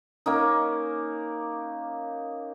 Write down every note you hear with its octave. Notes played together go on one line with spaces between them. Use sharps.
A#3 C#4 D#4